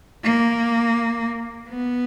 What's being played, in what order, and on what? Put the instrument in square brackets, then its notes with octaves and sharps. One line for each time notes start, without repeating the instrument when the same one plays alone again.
[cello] A#3
B3